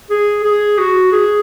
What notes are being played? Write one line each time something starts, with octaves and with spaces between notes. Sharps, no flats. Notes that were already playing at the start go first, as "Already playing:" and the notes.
G#4
G#4
F#4
G#4